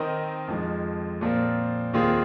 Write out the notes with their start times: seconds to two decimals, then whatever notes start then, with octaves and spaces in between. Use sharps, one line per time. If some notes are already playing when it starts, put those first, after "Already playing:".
Already playing: D#3 C4 D#4 A#4 D#5
0.48 F2 F3 G#3
1.21 A#2 F3 C4 F4 A#4
1.93 D#2 D#3 C4 F4 G#4